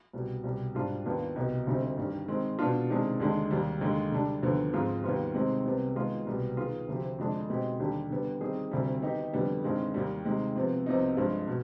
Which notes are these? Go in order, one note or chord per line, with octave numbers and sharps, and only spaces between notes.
C2 B2 G3
C2 B2 G3
G#2 G3 D4 F4
D#2 D#3 B3 D4 F4
C2 B2 B3 D#4 G4
D2 D3 G3 C4 D#4
G2 D#3 G3
D#3 G#3 C4
B2 B3 D4 F4
C3 D#3 G#3 D4 G#4
D#2 D3 G#3 D4
D#2 D#3 G3
D#2 D3 G#3
D3 G3 D4
D#2 D3 F3 B3
G#2 F3 C4 F4 G#4
D#2 D#3 G3 B3 F4
C3 D#3 G#3 C4
C2 C3 G3 B3
D#3 G#3 B3 F4
C2 B2 G3 B3
D#3 B3 F4 G#4
D2 C3 F3 C4 G4
F2 D3 G#3 D4 G#4
B2 G#3 C4 D#4 G4
D#2 D3 G3 D4 G4
D3 G3 B3
D#3 G3 C4 D#4 G#4
D2 C3 G3
D#3 B3 D#4 G4
F2 D3 G3 B3
G2 D#3 G#3 C4
D#2 D#3 G3
C3 D#3 G#3
C3 F3 B3
C2 C3 F3 B3 D#4
G2 F3 G#3
B2